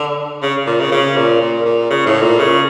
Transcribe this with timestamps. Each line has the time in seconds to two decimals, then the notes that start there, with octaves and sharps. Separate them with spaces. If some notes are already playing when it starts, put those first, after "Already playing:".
Already playing: D3
0.43 C#3
0.67 A#2
0.80 C#3
0.92 C#3
1.16 A#2
1.41 A#2
1.65 A#2
1.90 C#3
2.06 A2
2.22 A#2
2.39 C#3